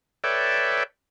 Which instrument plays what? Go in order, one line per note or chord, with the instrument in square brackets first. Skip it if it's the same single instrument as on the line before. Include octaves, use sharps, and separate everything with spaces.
[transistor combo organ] A4 B4 C#5 D5 E5 G5